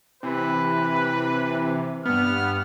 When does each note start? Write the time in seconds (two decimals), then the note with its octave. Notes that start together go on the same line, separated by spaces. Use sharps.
0.23 C3 E3 B4
2.05 G2 B3 F6